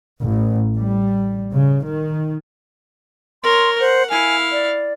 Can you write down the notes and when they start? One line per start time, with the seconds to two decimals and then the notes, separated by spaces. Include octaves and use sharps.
0.22 A1
0.77 G3
1.54 C#3
1.85 D#3
3.44 A#4 C#5 C6
3.80 C5 F#5
4.10 E4 F5 G#5
4.52 D5